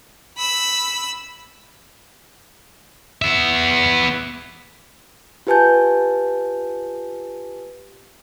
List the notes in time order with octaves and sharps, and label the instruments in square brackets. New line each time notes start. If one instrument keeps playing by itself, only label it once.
[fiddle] B5 E6
[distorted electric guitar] B3 E5
[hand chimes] F4 G4 B4 G#5 A5 G6